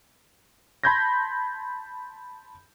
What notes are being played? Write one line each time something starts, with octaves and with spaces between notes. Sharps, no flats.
A5 B5 C6 G6 G#6 A#6